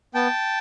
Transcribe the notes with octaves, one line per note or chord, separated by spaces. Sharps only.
B3 G5 A5